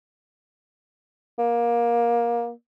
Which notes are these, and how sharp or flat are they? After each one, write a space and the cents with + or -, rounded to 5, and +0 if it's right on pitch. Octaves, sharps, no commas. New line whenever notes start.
A#3 +20